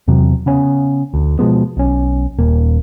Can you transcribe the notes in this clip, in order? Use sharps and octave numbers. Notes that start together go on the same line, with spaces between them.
E2 C3 F#3
C#3 B3 C#4
D2
B2 F3 G#3 B3
B1 C#4
D#1 A#3